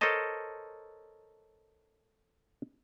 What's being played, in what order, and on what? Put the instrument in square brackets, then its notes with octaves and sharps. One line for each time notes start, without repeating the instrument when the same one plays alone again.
[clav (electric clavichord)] A4 A#4 C5 C#5 D#5 A5